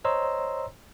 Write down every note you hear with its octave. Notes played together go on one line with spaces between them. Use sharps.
C5 C#5 D#5 A#5 C6 E6